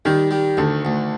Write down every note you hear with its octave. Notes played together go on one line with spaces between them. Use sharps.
D#3 G3
G3
D2 D3
D2